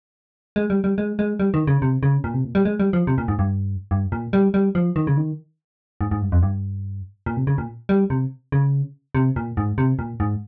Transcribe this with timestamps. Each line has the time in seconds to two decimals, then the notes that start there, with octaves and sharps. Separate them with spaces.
0.56 G#3
0.70 G3
0.84 G3
0.98 G#3
1.19 G#3
1.40 G3
1.54 D#3
1.67 C#3
1.82 C3
2.03 C#3
2.24 A#2
2.34 C3
2.44 A#2
2.55 G3
2.65 G#3
2.80 G3
2.93 F3
3.07 C3
3.18 A#2
3.28 G#2
3.39 G2
3.91 G2
4.12 A#2
4.33 G3
4.54 G3
4.75 F3
4.96 D#3
5.07 C#3
5.17 D#3
6.01 G#2
6.11 G#2
6.22 G2
6.32 F2
6.43 G2
7.26 A#2
7.37 C3
7.47 C#3
7.58 A#2
7.89 G3
8.10 C3
8.52 C#3
9.15 C3
9.36 A#2
9.57 G#2
9.78 C3
9.99 A#2
10.20 G#2